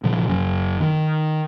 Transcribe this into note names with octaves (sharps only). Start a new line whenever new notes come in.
A#2 C#3 F3
F#1 F#2 C#3
D#3